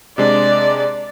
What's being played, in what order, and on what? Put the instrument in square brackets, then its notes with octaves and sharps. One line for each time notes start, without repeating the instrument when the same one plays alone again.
[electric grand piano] C3 G#3 D4 [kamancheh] D5